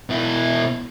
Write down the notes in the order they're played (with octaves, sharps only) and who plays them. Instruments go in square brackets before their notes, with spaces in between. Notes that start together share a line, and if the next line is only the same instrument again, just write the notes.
[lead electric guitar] B2 E4